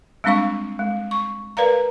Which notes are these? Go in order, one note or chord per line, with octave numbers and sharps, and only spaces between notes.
G3 G#3 C4 D4 F5 C#6
G#3
C#6
A#4 B4 D5 F5 A#5